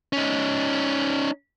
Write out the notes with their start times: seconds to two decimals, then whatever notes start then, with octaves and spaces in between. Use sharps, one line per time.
0.13 C#4 D#4